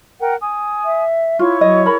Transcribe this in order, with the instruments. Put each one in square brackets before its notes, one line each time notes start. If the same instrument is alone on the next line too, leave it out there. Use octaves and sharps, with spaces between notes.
[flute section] A#4 F#5 G5
G#5 D#6
[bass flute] E5
[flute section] E4 C#5 C#6 [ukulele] F4
[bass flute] F#3 [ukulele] D#5
[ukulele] G#4 A#4 B5